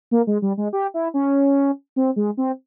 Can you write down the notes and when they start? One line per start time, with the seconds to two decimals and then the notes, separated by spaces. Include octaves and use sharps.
0.11 A#3
0.27 G#3
0.42 G3
0.57 G#3
0.73 G4
0.94 E4
1.14 C#4
1.96 C4
2.16 G#3
2.37 C4